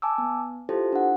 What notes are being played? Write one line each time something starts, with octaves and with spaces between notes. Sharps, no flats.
G#5 A5 D6 E6
B3
E4 F4 G4 A4 C5
D4 F#5